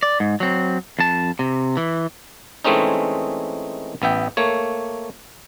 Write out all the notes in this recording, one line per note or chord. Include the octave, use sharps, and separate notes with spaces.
D5
G#2
F#3 C4
F2 A5
C3
E3
E3 G#3 A3 C4 C#4 D#4
A1 B3 E5 G5
A3 A#3 C#5